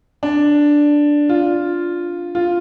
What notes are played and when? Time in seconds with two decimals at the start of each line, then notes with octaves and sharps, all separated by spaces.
0.23 D4
1.29 F4
2.35 F4